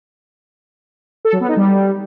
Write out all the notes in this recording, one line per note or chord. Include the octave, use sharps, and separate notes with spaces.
A4
F#3
B3
D#4
G3